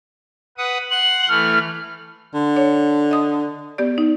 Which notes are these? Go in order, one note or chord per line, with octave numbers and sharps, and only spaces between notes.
B4 F#5 D#6
F#5 C6 F#7
E3 A3 F6
D3
C#5
D#5 D#6
B3 G4 D5
D#4